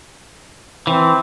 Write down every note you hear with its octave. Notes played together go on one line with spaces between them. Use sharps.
E3 C4